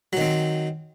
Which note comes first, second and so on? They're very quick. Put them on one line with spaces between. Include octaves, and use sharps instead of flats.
F#3 D#3 C4